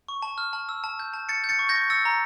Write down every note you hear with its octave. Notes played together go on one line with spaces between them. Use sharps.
C#6
A5
F6
A5
E6
A5
G6
A5
G6 A6 C#7
G6
A6 C#7
C#6
G6 A#6
C#6
E6 A6 C#7
A#5